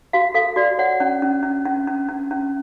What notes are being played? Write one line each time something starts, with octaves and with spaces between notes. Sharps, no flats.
F#4 F5
A4 F5
F#4 D5
C#5 F#5
C#4
C#4
C#4
C#4
C#4
C#4
C#4